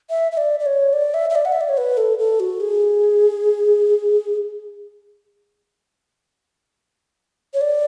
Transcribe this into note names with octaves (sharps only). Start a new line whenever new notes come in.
E5
E5
D5
D5
C#5
D5
E5
E5
D5
F#5
E5
D5
C#5
B4
A4
A4
F#4
G#4
C#5
D5